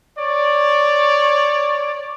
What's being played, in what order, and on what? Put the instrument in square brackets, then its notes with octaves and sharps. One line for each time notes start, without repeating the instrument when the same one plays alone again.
[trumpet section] C#5 D5